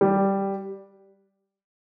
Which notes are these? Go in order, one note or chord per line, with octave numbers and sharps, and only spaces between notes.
G3